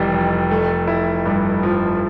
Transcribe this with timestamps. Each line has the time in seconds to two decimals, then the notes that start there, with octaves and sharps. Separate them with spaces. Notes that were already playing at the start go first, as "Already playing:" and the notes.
Already playing: F1 E3 G3
0.14 F2
0.51 A3
0.87 E4
1.25 G2
1.63 F3